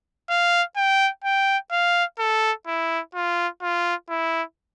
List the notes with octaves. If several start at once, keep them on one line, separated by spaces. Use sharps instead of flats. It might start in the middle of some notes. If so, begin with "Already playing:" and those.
F5
G5
G5
F5
A4
E4
F4
F4
E4